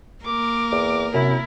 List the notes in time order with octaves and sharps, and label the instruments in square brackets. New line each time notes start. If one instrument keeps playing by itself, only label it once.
[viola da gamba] A#3 A#4 [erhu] D6
[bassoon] E2
[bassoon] F#2 [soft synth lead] C3 [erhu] E4